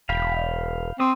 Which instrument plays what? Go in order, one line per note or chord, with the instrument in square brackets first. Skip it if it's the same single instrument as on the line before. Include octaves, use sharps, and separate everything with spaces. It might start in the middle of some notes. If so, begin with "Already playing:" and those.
[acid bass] E1 [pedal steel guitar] F5 G5 B5
[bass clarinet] C4 [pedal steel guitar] C5 D#6